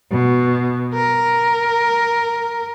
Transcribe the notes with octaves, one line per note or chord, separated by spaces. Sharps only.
B2
A#4